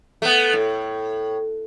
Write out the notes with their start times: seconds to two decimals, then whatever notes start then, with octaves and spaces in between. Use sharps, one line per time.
0.22 A3 B3
0.53 A2